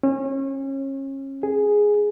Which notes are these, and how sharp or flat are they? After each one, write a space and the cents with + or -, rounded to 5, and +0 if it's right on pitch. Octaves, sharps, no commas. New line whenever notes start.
C#4 -30
G#4 +0